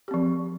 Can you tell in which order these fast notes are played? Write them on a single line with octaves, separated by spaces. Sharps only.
G4 C4 F3